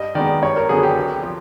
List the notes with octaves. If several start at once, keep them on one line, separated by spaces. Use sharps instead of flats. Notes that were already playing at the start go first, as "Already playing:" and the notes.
Already playing: G2 D#5
D#3 G#3 B3 D5
G2 C#5
A#4
D3 F#3 B3 G#4
G4
C2
F3